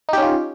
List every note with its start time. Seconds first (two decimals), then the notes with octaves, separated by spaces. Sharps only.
0.09 D#4
0.13 G4
0.18 C#4
0.22 F4